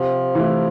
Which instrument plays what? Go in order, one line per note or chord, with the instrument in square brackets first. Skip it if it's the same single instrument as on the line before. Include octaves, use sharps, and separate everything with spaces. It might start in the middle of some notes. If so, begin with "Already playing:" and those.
Already playing: [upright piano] C3 [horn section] F3
[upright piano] E3 A3 E4